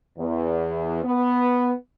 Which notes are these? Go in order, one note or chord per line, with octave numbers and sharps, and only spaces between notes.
E2
B3